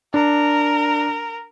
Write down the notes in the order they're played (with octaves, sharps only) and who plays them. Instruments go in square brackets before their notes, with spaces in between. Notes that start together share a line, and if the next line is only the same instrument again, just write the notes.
[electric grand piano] D4 [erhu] A#4